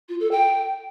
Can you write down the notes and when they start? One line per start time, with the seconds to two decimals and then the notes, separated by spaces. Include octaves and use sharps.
0.08 F4
0.20 A4
0.31 G5